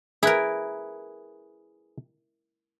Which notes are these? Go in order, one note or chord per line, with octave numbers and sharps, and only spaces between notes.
E4 G#4 A#4 B4